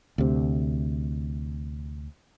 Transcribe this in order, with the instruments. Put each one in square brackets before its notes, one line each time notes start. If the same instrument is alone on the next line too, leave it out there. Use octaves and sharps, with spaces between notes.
[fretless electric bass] D2 C3